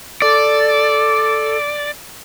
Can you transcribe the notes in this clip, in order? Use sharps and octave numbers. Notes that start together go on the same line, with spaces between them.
A4 D5